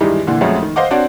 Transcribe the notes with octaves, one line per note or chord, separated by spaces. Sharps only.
G2 D#3 E3 G#3 D#4 G4
A#2 D3 E3
F2 F3 F#3 G#3 A3 C#4
D#3
C5 D#5 F5 F#5 D6
C4 D4 F#4 C#5 D5